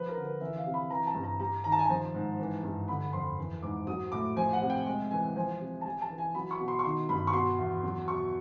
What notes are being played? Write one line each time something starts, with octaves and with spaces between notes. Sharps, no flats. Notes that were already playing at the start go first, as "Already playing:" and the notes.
Already playing: F3 B4
A#4
D3
B4
E3 E5
F5
C3
B5
E3 A#5
A5
G2
A#5
G3 A#5
D#3 A#5
A5
G#5
F3 A5
G#2
E3
G2
D3 B5
F2 C6
E3
G#2 D6
F#3 D#6
A2 D6
F3 G#5
F#5
C3
G5
G#3
E3 G#5
F3 G#5
C3
A5
G3 G#5
A5
E3
G#5
F#3 B5
C#6
B2
C6
C#6
D#3 C6
G2 B5
C#6
B2 C6
E2
F#3
B2 C#6